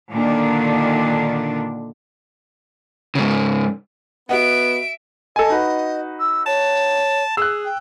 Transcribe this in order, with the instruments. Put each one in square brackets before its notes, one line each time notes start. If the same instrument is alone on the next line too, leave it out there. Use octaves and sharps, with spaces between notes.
[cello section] A#2 D3 D#3 D4
[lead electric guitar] G#2 C#3
[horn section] B3 [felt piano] F#4 D#5 F#5 [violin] E5 D7
[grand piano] A4 G#5 [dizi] D#5
[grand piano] D#4 F#4 B4
[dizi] E6
[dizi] C#5 [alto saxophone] A5
[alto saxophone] G#4 [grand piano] E6 F#6
[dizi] G5